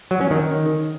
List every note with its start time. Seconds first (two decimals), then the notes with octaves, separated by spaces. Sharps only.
0.11 F#3
0.21 C#4
0.31 D#3